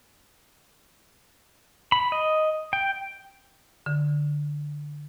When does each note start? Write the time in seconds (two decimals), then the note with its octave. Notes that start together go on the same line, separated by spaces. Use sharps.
1.92 B5
2.12 D#5
2.73 G5
3.86 D3